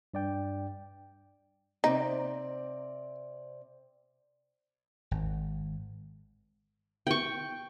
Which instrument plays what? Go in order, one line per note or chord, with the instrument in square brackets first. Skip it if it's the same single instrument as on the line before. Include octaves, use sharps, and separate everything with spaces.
[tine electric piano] G2 D5 G5
[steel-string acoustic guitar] C3 C4 D5 [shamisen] D#4
[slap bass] G#1
[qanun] G5 C#6